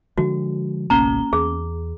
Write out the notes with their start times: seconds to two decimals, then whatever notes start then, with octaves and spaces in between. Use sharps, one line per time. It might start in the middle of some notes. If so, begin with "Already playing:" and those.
0.18 D3 F3 G#3 F#4
0.90 G#1 C#2 B2 A#3 C#4 A#5 G7
1.33 E2 G#4